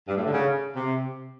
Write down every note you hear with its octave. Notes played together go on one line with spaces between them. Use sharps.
G2
A2
D3
C#3
C3